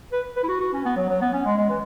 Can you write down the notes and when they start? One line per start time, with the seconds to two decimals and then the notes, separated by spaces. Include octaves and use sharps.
0.12 B4
0.36 B4
0.44 E4
0.48 F#4
0.60 F#4
0.73 C#4
0.85 B3
0.96 F#3
1.09 F#3
1.21 B3
1.33 C#4
1.45 G#3
1.58 G#3
1.69 E3